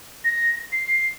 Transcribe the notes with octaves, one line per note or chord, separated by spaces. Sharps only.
A#6
C7